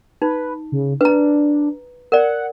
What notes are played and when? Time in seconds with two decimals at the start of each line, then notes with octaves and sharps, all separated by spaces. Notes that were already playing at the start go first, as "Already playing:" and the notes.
0.22 D#4 B4
0.72 C#3
1.01 D4 B4 A#5
2.12 A#4 D5 F#5